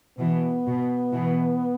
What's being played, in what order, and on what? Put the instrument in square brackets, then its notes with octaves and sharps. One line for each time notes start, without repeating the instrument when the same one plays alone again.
[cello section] B2 E3 [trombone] B3
[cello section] B2
B2 E3